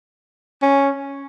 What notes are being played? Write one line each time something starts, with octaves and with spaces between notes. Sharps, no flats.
C#4